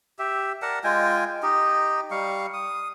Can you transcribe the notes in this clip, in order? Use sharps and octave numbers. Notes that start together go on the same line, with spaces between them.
G4 E5
A#4 D5 F#5 A5
G#3 F4 G5 G#5
D#4 G4 D#5
G3 F5 C#6
D#6